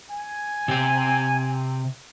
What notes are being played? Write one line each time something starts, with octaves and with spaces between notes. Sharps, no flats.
G#5
C3 G4